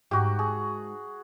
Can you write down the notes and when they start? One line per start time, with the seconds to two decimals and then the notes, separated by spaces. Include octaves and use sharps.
0.11 G#2 F#4 G4
0.39 G#4